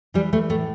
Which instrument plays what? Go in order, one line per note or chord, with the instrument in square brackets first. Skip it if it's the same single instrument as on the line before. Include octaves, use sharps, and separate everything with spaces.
[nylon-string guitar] E3 G3
E3 A3
A2 A3